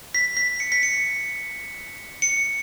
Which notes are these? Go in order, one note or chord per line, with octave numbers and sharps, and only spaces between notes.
B6
B6
C#7
B6
C#7
C#7